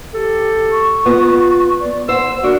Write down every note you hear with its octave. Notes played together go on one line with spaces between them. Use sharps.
G4 A4
C#6
B3 F4
D5
C5 F#5 E6
D4 F#4 A#4